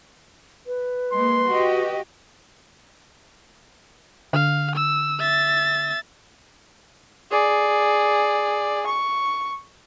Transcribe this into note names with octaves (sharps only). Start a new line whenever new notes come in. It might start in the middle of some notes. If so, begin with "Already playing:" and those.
B4
G#3 A#3 C6
F#4 G4 D#5
D3 F5
E6
E5 A6
G#4 D5
C#6